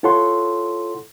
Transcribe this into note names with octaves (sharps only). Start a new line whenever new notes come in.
E4 F4 A4 C#5 F#5 C6